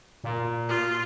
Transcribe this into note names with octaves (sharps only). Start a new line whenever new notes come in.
A#2
F4